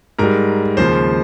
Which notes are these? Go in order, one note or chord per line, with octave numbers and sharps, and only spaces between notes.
G#2 G3 A#4 A#5
D#2 C#3 F3 G#3 C5 C6